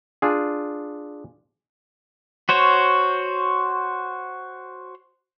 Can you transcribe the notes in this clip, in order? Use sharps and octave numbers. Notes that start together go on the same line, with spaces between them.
D4 F4 G#4
F#4 C5 C#5